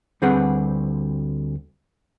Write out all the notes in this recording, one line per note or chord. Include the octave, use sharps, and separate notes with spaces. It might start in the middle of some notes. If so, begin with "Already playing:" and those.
D2 G3 C4 G#4 B4 F#5